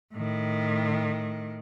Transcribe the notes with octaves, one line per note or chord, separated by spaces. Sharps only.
A2 D#3